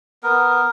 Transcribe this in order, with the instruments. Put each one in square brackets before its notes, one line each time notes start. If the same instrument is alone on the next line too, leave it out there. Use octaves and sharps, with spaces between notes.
[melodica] B3 A#4